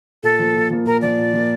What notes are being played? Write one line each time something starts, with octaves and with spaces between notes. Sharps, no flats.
A#2 A4
F3 A#3
A#2
F3 A#3
A#2 A#4
F3 A#3 D5
A#2
F3 A#3